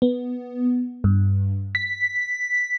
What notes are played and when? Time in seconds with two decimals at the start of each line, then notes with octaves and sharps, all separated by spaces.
0.02 B3
1.04 G2
1.75 B6